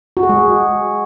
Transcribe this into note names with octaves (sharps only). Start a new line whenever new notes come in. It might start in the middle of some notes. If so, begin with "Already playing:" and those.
F#4
G#4
G#3